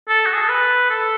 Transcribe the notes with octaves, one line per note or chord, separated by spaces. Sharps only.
A4
F#4
G#4
A4
B4
A4